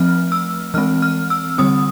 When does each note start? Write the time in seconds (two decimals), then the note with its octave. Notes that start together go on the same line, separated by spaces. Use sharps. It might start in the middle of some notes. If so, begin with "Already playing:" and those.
Already playing: F3 A3 C4 F6
0.32 E6
0.74 E3 G#3 C4 F6
1.02 F6
1.30 E6
1.58 D3 G3 C4 D#6